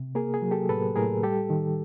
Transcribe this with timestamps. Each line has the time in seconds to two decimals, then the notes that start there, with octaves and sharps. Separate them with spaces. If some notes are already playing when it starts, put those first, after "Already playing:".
Already playing: C3
0.15 A#3 G#4 A#4
0.34 G#4
0.42 F#3
0.51 G4 A4
0.69 A2 A4 B4
0.96 A2 G#4 A#4
1.23 G3 G4 A4
1.50 D#3